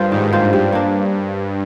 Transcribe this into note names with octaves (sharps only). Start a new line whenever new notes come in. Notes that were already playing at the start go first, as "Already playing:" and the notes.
Already playing: G2 A#3 F4 C5
G#2 D#3
A#3 F4 C5
G2 G3
A#3 D4